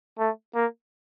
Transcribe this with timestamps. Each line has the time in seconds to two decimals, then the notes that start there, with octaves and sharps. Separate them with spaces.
0.19 A3
0.55 A#3